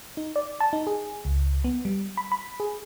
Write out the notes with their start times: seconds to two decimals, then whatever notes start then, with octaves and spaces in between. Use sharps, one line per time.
0.17 D#4
0.36 D5
0.60 A5
0.73 D#4
0.87 G#4
1.25 C#2
1.64 B3
1.85 G3
2.17 B5
2.32 B5
2.60 G#4